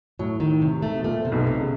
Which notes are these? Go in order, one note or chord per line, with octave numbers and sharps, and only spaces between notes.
A2 F#3
D#3
C3
A3
B2
A#2 A3
C3
B1 B2
C3
C#3